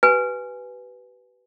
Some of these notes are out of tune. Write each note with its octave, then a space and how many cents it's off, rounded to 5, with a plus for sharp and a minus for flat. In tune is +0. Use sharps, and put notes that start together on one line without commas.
G4 -45 B4 +0 G#5 +0